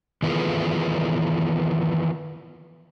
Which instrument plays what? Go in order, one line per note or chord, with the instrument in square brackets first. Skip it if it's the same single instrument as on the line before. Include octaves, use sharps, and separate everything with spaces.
[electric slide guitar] D#3 E3 B3 F4 G#4 A4